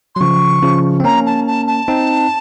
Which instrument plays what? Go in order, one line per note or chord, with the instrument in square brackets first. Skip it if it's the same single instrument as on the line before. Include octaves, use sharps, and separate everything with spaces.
[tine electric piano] F#3 [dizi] C6
[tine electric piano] C#3 F3 [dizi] C#6
[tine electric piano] C#3 F3
C4
[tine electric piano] A#3 C#4 [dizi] A#5
[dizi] A5
A5
A5
[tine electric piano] C4 D#4